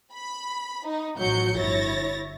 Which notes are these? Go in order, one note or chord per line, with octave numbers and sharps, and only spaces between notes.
B5
D#4
A1 F3 F#3 F#4 G6 C#7
G1 E4 C#5 A6 A#6